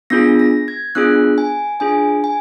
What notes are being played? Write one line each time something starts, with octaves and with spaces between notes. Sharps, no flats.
B3 D4 F4 G#4 A#6
A#6
G#6
B3 D4 F4 G#4 F#6
G#5
D4 F4 G#4 G#5
G#5